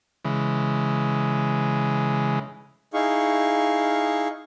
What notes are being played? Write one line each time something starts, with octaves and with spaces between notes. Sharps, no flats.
C#3 E3 G#3
D#4 E4 G#4 F5 C#6